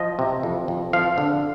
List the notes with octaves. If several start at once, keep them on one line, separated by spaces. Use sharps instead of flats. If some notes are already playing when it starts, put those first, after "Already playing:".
Already playing: F3 D#5
C3
F2
F2
F3 F5
D3